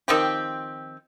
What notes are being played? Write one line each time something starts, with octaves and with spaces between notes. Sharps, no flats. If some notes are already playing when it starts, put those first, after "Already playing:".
D#3 F3 C4 G4